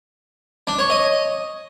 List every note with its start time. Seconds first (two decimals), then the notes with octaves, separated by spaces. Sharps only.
0.67 D4
0.79 C#5
0.90 D#5